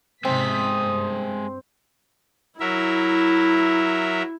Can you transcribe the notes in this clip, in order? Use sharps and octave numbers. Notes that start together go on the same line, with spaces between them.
G#2 C3 G#3 C4 E5 D#6 B6
G2
F#3 E4 A#4 E5